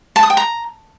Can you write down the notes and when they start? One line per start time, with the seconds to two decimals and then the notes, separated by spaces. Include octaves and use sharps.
0.16 A5
0.23 D#6
0.30 G5
0.37 A#5